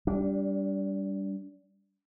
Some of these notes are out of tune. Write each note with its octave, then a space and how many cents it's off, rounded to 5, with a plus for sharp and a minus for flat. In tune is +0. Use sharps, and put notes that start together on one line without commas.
G3 +0 D4 -30